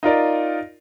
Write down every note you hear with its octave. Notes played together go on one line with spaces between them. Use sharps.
D#4 F4 A#4 D5